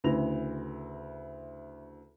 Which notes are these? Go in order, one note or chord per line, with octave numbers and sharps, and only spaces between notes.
D2 C#3 E4 B4 A#6 F7